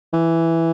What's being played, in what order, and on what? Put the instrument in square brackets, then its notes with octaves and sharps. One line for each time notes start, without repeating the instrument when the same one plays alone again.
[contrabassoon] E3